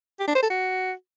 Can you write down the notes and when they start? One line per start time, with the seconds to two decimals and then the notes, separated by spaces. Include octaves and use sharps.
0.20 G4
0.27 D4
0.35 C5
0.42 A4
0.50 F#4